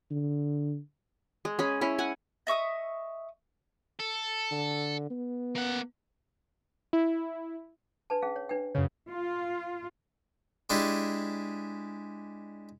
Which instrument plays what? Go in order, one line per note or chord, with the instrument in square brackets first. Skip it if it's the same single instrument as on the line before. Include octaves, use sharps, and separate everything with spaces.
[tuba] D3
[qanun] G#3
C#4 G#4 B5
C#4 E4
F#5 G#5
[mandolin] D#5 E5 C#6 D#6
[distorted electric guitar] A4
[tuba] D3
B3
[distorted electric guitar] A#3 F#5
[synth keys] E4
[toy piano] D4 B4 A5
C#4 G#4 F5
C#5
D4 B4 G5
[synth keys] F#2 C#3 [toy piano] C#5
[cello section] F4
[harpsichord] G#3 D4 E4 G4 G#4